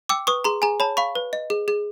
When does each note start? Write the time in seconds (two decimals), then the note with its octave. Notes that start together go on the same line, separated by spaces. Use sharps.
0.09 G5 D6 E6
0.27 B4 C#6 D#6
0.44 G#4 A#5 C6
0.62 G#4 G#5 A#5
0.80 C#5 A5 B5
0.97 F5 B5 C#6
1.15 B4
1.33 D#5
1.50 G#4
1.68 G#4